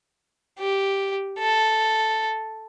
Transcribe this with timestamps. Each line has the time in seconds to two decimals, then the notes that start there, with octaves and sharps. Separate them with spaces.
0.58 G4
1.39 A4